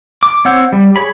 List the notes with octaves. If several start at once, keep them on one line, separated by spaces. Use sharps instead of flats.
D6
C4 C#5 F#5 E6 G6
G3
G#4 C#5 B5